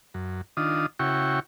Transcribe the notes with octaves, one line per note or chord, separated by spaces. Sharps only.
F#2
D#3 D4 F4 D#6
C#3 E4 F#4 G5 C#6